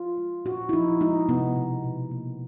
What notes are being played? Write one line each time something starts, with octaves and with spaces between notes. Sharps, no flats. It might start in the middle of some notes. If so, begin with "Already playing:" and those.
Already playing: F4
G#3
A#2 F#4
E4
F3 D#4
G#3 D#4
C3 B3
B2
B2
A#3